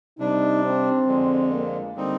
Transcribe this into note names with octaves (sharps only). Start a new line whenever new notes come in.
C3 G3 D4 D#4
C4
F2 D3 G#3
A#3
D3 G3 C4 D#4